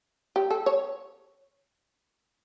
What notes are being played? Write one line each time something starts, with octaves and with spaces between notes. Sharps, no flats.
G4
A4
C#5